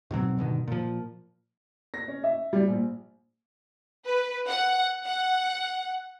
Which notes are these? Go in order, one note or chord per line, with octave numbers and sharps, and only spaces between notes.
G#2 B2 F#3 C4
G2 B2 D3 D#3
A#2 F3
A#6
C#4
E5
G3
A#1
B4
F#5
F#5